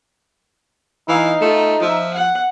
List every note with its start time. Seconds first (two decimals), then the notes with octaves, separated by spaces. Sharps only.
1.09 E3 D#4 F5
1.41 A3 F4
1.82 F3 E5
2.13 F#5